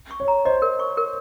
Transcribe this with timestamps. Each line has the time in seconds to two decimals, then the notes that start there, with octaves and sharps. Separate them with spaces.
0.11 C#6
0.20 C#5
0.28 A#5
0.45 C5 D#5
0.62 A#4
0.80 C#6
0.97 A#4